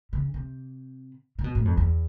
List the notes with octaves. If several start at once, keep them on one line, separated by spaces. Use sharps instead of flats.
C#3
C3
C3
B2
A2
F2
E2